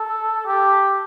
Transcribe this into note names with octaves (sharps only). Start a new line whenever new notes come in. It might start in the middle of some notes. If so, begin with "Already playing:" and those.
Already playing: A4
G4